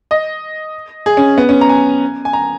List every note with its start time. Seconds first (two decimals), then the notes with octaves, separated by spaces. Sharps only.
0.11 D#5
1.06 G#4
1.17 C#4
1.38 B3
1.49 C#4
1.61 A#5
1.69 G#5
2.25 G#5
2.33 A#5